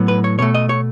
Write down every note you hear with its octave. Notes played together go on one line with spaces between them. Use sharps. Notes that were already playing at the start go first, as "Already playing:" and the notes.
Already playing: A2 F#3 B3
B4
C#5
B2 A3 C#5
D#5
C#5